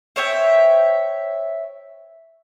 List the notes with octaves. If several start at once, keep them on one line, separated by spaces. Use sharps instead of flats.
C5 C#5 E5 G5